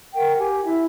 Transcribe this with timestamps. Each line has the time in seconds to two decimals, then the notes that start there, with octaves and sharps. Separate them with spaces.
0.14 A#4 F#5 G5
0.39 G4 G#5
0.64 E4 E5